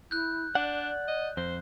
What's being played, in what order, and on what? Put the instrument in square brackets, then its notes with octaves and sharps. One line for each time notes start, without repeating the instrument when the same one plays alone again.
[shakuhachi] E4 [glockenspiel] F#6 G6
[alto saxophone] D4 [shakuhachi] D5 [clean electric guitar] F#5
[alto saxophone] D#5
[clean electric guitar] F2 [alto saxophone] C5